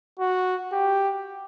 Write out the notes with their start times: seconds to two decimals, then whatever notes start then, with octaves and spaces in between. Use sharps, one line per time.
0.20 F#4
0.72 G4